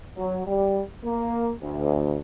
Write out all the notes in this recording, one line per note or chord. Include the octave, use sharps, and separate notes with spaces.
F#3
G3
A#3
D2